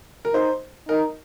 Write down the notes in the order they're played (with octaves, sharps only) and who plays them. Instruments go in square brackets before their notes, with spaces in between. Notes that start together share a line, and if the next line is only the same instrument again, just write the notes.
[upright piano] A#4
[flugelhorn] D#4 [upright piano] C5
[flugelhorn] D#4 [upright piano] A#4